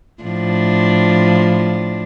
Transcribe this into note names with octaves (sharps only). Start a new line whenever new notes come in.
A2 F3 D4